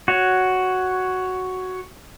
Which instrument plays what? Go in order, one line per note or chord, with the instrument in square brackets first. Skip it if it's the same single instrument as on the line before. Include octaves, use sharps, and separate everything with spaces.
[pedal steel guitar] F#4 C#5